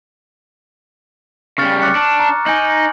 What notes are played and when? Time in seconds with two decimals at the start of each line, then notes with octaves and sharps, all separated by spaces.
1.58 C#3 G3 C#6 F6 A6
1.82 D6 F#6 C#7
1.95 D4
2.20 A#5
2.46 D#4 G#5 G6 F#7